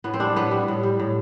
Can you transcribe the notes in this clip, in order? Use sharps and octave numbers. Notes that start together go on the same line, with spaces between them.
A2 B3
C4
G3 D4
A2 B3
G3
A2
G3
A2